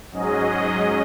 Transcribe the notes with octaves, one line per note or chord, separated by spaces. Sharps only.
G#2 F#3 C#4 G#4 D#5